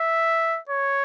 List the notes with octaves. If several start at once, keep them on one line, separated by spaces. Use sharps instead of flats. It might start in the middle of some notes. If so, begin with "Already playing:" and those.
Already playing: E5
C#5